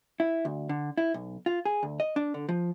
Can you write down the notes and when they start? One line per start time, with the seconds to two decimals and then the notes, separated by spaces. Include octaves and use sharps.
0.20 E4
0.45 D2
0.69 D3
0.98 E4
1.14 B1
1.46 F4
1.65 G#4
1.83 D2
2.00 D#5
2.16 D4
2.34 D3
2.49 F3